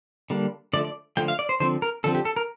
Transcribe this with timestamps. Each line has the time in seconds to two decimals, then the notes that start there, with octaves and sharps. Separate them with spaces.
0.30 D3 G3 A#3 D4
0.73 D3 F3 A3 D5
0.85 D5
1.17 D3 F3 A3 G5
1.28 F5
1.39 D5
1.49 C5
1.60 D3 F3 C4 C5
1.82 A#4
2.04 D3 F3 C4 A4
2.15 G4
2.25 A4
2.36 A#4